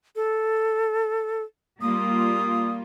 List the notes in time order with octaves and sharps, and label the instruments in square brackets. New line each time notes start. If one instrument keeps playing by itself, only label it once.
[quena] A4
[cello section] G3 A#3 F4 [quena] D#6